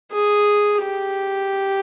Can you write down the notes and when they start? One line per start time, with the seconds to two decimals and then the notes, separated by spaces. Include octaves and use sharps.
0.13 G#4
0.82 G4